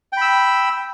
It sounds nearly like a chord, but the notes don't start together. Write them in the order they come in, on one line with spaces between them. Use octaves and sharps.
G5 B5 E6